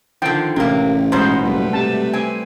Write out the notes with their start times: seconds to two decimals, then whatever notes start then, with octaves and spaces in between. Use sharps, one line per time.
0.22 D3 D#3 F3 G5
0.56 A1 C3 A#3
1.12 G#2 B2 G#3 D#4 C5
1.43 F#1 G3 A3 B4
1.73 C3 A5
2.13 C4 G#5